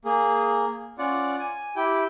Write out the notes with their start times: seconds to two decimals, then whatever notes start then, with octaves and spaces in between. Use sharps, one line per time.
0.05 A#3 G#4
0.99 C#4 F4 D5 F#5
1.40 G#5
1.76 E4 G4 G5